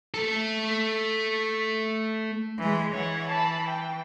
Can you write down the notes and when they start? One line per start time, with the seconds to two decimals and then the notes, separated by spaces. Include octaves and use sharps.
0.14 A3 A4
2.58 E3 G#3
2.92 E3 C#5 F#5
3.29 A5 B5
3.67 G5